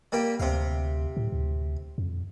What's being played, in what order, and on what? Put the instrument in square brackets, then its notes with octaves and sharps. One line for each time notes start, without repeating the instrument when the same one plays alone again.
[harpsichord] G3 A#3 G4
[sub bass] D2 [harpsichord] C3 F5
[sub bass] A2
D2
F2